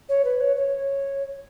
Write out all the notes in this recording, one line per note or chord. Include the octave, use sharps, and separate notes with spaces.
C#5
B4
C#5
C#5